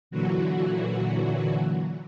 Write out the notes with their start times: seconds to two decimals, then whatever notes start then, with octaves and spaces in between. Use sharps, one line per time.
0.11 A#2 D3 E3 F#3 F#4